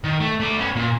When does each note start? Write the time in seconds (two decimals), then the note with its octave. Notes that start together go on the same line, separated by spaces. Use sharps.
0.04 D#3
0.20 A3
0.40 A3 D5
0.57 B3 C#4
0.76 A#2